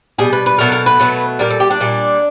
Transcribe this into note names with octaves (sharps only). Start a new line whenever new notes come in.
B2 G3 G#4
B4
B4
B2 F#3 A3 A#4
A#4
B4
B2 F#3 A3
A#2 G3 A#4
A4
G4
D4
A#2 G3